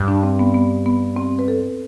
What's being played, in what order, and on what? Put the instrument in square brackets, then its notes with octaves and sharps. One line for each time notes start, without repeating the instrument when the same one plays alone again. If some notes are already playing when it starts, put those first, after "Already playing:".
Already playing: [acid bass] G2
[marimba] D4
C4
B3
B3
B3
C4
B4
A4